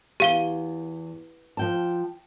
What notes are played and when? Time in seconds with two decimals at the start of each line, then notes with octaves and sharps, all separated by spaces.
0.20 E2 G4 F5 G7
1.57 F3 G5 A5